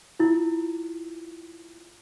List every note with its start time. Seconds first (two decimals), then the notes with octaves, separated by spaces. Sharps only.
0.19 E4 F4